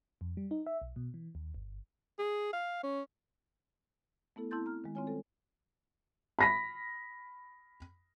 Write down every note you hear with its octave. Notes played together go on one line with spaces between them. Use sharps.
F2
G3
D#4
E5
B1
B2
E3
D#2
G1
G#4
F5
C#4
A3 B3 E4 A4
C4 E4 A5 C6 G6 A6
A#5 F6
D#3 G#3
C4 C#4 F4 C#5 G#5
G3 C4 A4 C5
B5 A#6 B6